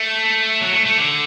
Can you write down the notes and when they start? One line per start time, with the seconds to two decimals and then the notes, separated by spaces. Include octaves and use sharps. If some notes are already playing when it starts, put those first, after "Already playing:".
Already playing: A3
0.61 F#3
0.73 A3
0.86 A3
0.98 D3